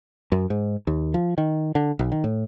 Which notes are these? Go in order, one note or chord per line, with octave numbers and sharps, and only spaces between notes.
F#2
G#2
D#2
F3
D#3
D3
B1
D#3
A2